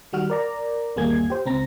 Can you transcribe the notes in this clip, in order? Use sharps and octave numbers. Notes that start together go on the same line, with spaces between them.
D#3 G3 F#4 F6
A#4 D5 A#5
G1 D#2 G3 A#3 G#4 G#6
G4 C5
C#2 C4 A#5 A#6